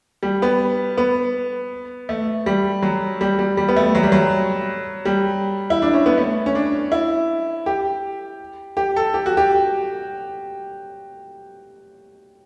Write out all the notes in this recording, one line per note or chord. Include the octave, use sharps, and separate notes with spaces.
G3
B3
B3
A3
G3
F#3
G3
G3
G3
B3
A3
F#3
G3
F#3
G3
E4
D4
C#4
B3
A3
C#4
D4
E4
G4
G4
A4
G4
F#4
G4